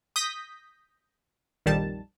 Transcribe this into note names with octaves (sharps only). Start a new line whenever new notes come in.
D#6 G6 A#6 B6
A#1 F2 D#3 G3 A5